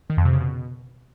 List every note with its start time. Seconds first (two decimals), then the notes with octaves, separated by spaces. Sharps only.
0.10 D#3
0.17 F2
0.25 C3
0.33 C#3
0.40 B2